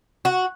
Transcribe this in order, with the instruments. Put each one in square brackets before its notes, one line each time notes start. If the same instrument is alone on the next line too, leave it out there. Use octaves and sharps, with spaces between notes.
[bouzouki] F#4